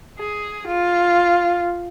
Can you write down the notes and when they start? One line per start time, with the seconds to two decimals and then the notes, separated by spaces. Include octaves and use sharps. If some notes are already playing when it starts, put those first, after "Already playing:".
0.19 G#4
0.67 F4